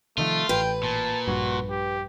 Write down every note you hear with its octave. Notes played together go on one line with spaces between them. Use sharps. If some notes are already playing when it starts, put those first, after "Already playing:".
C3 D#3 F3 A3 F4
A1 B4 G5
A#2 A5
A#1 G2 F#4
G4